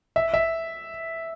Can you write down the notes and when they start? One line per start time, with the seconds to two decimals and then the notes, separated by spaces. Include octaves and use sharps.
0.16 E5
0.34 E5